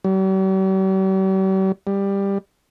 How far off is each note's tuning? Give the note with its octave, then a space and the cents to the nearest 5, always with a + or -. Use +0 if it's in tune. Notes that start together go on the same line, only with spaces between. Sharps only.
G3 -45
G3 +15